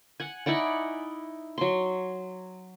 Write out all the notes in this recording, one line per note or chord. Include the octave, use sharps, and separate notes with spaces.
F#5 G#5
D#4 E4 D5 F#5
F#3 C6